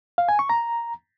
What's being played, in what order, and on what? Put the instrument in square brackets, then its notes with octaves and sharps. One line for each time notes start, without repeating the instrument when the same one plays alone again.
[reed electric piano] F5
G#5
C#6
A#5